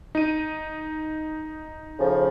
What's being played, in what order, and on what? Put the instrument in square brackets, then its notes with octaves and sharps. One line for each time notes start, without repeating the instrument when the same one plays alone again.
[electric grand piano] D#4 D#7
[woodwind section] A2 C#3 F3